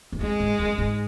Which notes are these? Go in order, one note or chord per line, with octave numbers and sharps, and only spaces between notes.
F#2
F2 G#3
G#2
F#2
G#2